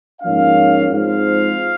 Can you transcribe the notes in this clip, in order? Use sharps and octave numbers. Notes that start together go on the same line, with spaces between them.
G#2 F3 A#3 C#4 F5
G#2 F3 C4 F5